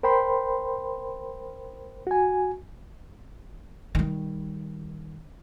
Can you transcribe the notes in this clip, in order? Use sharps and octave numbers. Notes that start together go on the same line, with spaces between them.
A#4 C5 G5 B5 C6
F#4 G#5
D#3 G3